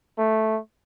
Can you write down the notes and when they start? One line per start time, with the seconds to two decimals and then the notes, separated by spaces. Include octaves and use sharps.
0.18 A3